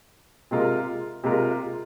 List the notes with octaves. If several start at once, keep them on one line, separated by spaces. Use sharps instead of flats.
C3 G#3 F4 A#4
C3 G#3 F4 A#4